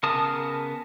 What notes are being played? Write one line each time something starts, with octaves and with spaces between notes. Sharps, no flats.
C#3 B3 A#4 A5 D#6